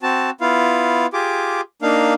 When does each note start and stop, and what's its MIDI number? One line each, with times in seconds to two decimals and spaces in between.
0.03 0.30 60
0.03 0.30 66
0.03 0.30 81
0.41 1.06 59
0.41 1.06 64
0.41 1.06 65
0.41 1.06 77
1.13 1.61 65
1.13 1.61 67
1.13 1.61 68
1.13 1.61 86
1.82 2.14 58
1.82 2.14 62
1.82 2.14 63
1.82 2.14 77